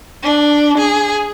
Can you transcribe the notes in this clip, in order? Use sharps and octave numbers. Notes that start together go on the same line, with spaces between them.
D4
G#4